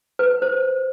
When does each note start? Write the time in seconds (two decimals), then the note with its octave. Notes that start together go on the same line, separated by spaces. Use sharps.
0.19 B4
0.42 C5